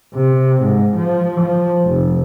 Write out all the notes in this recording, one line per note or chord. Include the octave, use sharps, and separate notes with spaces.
C3
G#2
F3
F3
F1